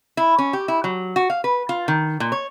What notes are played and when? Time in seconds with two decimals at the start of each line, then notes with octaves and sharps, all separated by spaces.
0.17 E4
0.39 C#4
0.53 G4
0.68 E4
0.84 F#3
1.16 F#4
1.30 F5
1.44 B4
1.69 F4
1.88 D#3
2.20 A#2
2.32 C#5